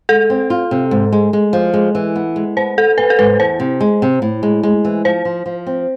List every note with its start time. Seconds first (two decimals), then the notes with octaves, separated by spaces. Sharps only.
0.09 G#3 A4
0.30 C4
0.50 F4
0.71 C3
0.91 G#2
1.12 G#3
1.33 G#3
1.53 F3
1.74 G#3
1.95 E3
2.16 B3
2.36 G#3
2.57 B3 C5
2.77 B3 A4
2.98 B3 B4
3.10 A4
3.19 G#2 B4
3.39 E2 C5
3.60 C3
3.81 G#3
4.02 C3
4.22 A2
4.43 G#3
4.63 G#3
4.85 E3
5.05 F3 C5
5.25 F3
5.46 F3
5.67 C4